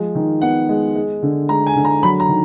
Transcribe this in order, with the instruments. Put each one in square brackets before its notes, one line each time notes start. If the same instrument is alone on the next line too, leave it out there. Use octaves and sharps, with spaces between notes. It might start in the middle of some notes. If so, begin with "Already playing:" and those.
Already playing: [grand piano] F3 G#3
D#3
B3 F#5
G#3
G#3
D3
G#3 A#5
G#5
D3
A#5
F#3 B5
A#5
D#3